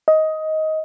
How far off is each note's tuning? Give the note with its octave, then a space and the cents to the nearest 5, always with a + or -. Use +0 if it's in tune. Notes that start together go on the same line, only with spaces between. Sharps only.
D#5 +15